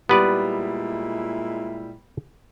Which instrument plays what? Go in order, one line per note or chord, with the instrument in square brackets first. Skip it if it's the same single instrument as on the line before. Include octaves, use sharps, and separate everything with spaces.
[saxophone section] A#2 G#3 E4 [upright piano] G3 [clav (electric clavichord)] B3 B4 D5